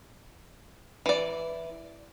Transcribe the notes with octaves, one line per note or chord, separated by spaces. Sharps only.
E3 D5